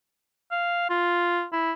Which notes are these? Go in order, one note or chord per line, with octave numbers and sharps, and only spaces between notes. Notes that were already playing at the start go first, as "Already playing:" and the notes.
F5
F4
E4